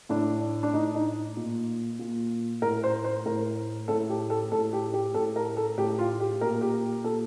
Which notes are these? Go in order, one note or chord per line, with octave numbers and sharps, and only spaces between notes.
A2 D4
D4
A2 D#4
D#4
A#2
A#2
A2 A#4
C5
C5
A2 A#4
A2 A4
G4
A4
A2 A4
G4
G4
A2 A4
A#4
A4
A2 G4
F4
G4
A#2 A#4
G4
A#2 A4